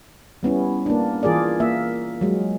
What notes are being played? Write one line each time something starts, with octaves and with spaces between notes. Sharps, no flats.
G3 B3 C#4 E4
A#3 D4
E3 F4 G#4 A#4 D5
A#3 E5
F#3 G#3